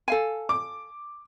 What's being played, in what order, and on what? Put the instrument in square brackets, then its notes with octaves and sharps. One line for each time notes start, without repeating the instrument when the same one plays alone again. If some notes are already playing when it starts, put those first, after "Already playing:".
[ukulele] A4 F5 G#5
[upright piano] D6